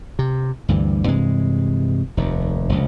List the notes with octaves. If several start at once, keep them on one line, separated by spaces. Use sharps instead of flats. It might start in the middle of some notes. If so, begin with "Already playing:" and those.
C3
D2 G2 E3 G3
G2 C3 E3 G#3
F1 D#2
F1 C#2